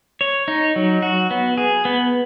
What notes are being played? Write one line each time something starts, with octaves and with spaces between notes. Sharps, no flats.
C#5
D#4
F#3
F#4
B3
G#4
B3